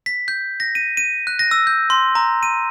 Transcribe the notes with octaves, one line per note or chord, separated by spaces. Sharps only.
B6
G6
A#6
D#7
D#7
F#6
A#6
E6
G6
C6
A#5
D#7